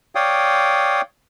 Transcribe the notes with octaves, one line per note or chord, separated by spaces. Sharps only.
C#5 D5 F5 G5 D#6